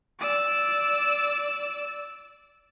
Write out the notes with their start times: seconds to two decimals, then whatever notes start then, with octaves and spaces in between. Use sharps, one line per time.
0.19 D5 E6